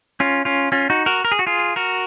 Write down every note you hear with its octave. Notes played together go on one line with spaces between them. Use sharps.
C#4 F4
C#4 F4
C#4 F4
D#4 F#4
F#4 A#4
A#4
G#4
F#4
F4 G#4
F#4 A#4